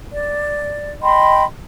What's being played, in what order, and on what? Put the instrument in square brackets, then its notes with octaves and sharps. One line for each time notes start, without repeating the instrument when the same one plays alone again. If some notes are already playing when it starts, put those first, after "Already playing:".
[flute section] D5
D#5 G5 B5 C6